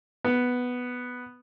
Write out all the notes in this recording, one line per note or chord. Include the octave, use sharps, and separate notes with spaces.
B3